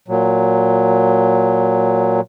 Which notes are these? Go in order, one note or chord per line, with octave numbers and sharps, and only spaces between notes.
A#2 F#3